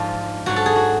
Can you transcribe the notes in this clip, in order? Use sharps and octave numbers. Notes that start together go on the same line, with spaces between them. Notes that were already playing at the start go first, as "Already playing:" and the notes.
Already playing: G#2 F3 D4 F4
G#2 F#3 F#4
A4
G#4
F#4